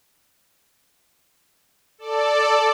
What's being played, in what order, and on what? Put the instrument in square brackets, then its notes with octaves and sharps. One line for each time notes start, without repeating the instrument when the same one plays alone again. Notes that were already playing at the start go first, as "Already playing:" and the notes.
[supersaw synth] A4 D5